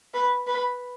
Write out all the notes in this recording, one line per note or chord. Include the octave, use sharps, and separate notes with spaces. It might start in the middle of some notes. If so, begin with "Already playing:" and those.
B4
B4